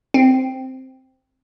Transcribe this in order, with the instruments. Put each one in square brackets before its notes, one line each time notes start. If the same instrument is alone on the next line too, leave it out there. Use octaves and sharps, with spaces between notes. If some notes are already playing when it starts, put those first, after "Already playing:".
[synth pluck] C4